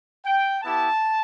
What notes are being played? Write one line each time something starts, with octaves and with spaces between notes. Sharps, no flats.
G5
B3 E4 G4 A5